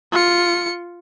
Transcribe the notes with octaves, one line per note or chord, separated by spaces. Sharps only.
F4 C#7